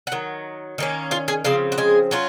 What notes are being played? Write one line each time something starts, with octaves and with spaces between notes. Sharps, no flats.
F#5
D#3 F#3
D#3 A#3 C#4
F4 F5
G#4 G#5
C#3 F3 C4 F5
F#4
G#3 G#4
F#3 C#4 F4